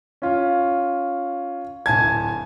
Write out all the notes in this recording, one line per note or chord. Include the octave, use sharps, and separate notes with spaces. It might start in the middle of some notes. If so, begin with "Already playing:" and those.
C#4 F4
D1 G#5 A5 G#6